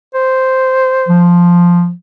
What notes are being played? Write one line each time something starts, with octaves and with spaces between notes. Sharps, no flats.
C5
F3